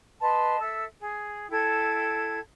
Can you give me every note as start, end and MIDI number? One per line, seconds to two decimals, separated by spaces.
0.20 0.59 71
0.20 0.59 75
0.20 0.59 81
0.20 0.59 84
0.60 0.84 69
0.60 0.84 76
0.60 0.84 88
0.99 1.48 68
1.50 2.38 64
1.50 2.38 69
1.50 2.38 79
1.50 2.38 92